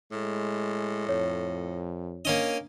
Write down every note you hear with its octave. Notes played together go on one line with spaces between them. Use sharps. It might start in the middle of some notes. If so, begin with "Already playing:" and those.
A2 G#3
F2 C#5
A#3 C#4 D4 D#5